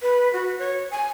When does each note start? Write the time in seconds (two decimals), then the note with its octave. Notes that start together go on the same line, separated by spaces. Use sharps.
0.02 B4
0.33 F#4
0.58 C#5
0.91 G#5